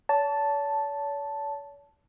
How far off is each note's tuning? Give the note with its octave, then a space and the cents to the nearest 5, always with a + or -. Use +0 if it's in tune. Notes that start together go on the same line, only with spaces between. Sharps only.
C#5 +45 A5 +0